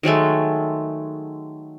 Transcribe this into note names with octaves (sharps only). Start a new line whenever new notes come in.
D#3 F#3 G#3 A3